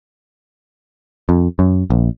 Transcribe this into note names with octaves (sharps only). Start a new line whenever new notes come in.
F2
F#2
A#1